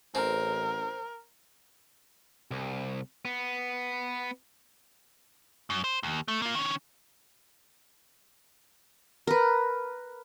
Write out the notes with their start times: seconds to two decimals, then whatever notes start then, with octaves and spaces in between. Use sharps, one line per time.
0.15 A1 C4 A#4
2.51 C2
3.25 B3
5.70 F#2
5.84 C5
6.03 D#2
6.28 A3
6.42 A#3 F4
6.55 D#3 C#4
9.27 A#4 B4